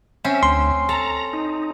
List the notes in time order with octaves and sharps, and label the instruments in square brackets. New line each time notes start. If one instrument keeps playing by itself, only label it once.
[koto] C4 C#4 [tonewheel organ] E5
[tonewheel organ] D2 [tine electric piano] C6
[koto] A4 [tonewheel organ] A#5
[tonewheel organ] D#4